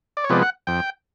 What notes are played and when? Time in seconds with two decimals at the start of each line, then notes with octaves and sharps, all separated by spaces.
0.17 D5
0.24 C#5
0.29 C3 F3 G#3 B3 D5
0.42 F#5
0.67 F2 G5